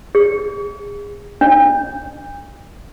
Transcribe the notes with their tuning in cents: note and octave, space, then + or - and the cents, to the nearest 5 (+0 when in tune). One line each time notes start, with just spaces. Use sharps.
G#4 -25
D4 -35